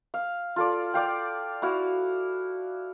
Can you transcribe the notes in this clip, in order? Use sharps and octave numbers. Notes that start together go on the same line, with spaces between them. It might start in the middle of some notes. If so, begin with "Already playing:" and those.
F5
F4 A4 D5
D5 F5 G5
E4 F#4 F5